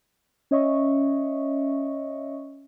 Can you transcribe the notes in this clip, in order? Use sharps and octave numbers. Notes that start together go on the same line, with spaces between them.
C#4 C#5 D#5 E5 C#6